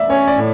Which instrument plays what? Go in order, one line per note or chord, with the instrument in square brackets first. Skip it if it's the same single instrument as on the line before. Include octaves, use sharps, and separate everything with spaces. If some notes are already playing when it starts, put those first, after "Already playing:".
Already playing: [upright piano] D5 E5
[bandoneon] C#4 [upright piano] C#5
[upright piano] D5
[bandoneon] A2